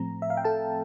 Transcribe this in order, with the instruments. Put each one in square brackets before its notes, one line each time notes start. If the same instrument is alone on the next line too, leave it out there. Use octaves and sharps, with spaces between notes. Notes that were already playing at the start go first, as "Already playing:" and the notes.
Already playing: [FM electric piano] A2 F3 A3 C4 A#5
E5
F5
G5
A4 A5